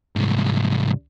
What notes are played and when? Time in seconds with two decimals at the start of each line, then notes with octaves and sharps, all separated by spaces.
0.16 C2 G#2